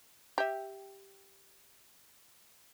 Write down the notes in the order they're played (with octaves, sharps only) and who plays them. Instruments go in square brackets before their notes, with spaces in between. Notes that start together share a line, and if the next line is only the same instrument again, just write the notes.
[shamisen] G4 E5